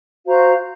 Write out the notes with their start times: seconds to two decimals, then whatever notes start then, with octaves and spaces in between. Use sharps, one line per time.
0.25 F#4 C5 F5 A#5